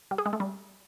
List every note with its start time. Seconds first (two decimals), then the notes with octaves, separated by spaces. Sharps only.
0.11 G3
0.18 G#4
0.26 G#3
0.33 A3
0.40 G3